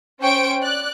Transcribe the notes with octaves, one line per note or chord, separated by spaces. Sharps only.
C#4 C5 G5 C#6 D7
D5 F#6